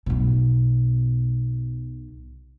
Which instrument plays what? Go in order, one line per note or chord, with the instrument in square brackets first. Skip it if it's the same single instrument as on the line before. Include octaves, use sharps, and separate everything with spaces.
[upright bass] B1 B2